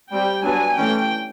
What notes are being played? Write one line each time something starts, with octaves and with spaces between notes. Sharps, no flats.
G3 C4 G5
F#3 B3 D4 G#5
E3 A3 C#4 G5